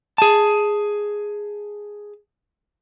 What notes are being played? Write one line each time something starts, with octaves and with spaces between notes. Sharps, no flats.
G#4 A5